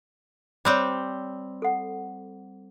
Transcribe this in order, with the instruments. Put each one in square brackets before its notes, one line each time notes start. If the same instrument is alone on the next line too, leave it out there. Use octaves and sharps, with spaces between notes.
[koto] G3 C4 G4 [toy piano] C5 C#5
[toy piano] A4 F#5